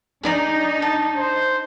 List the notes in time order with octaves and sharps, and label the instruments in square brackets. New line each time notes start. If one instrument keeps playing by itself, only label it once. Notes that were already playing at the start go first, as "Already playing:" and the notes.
[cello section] D4 D#4 [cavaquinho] G#4 D5 A#5
[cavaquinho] A5
[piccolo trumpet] C5